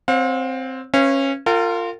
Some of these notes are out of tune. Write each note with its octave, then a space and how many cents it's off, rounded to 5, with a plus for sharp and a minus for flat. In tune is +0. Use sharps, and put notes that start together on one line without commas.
C4 +0 C#5 -20 F5 +45
C#4 -20 B4 +10 F5 -35
F4 +0 A#4 -40 G5 -45